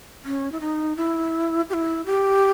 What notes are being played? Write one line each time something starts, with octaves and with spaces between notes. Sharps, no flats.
C#4
E4
D#4
E4
G4
E4
G4